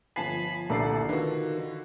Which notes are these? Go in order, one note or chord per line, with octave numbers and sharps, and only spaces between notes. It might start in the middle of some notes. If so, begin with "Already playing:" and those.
G1 F3 G#5 A5 B5 C7
C2 A#2 D3 A3 A4 D5 C7
D3 D#3 F4 F#4 B4